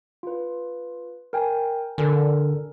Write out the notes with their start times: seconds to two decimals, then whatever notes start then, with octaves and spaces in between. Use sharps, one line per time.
0.23 F4 B4
1.33 A#4 G5 G#5
1.98 D3 A4 A#4 G#5